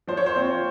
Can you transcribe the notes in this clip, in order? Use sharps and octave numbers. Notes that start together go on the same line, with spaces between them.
F3 C5
C#5
C5
C4 F4